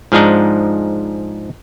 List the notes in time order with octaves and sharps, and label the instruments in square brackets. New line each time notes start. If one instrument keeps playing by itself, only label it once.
[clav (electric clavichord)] G#2 F3 G#3 D4 D#4